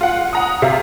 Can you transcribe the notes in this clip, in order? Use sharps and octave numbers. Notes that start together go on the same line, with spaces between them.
F4 F#5
F#5 A#5 D#6
C3 E5 F5